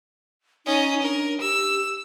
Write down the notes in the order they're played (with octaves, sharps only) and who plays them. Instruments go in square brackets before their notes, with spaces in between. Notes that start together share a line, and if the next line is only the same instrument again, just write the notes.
[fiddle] C#4 D#5 [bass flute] D#4
[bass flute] D4 [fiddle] A#4
[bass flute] G4 [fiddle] E6